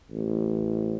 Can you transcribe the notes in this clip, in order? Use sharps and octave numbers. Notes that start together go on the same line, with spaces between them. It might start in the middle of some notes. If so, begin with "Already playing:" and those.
A1